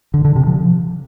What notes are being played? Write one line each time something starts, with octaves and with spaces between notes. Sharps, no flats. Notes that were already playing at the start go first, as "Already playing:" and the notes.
D3
D3
C3
F3